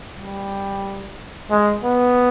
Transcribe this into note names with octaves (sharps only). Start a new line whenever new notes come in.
G3
G#3
B3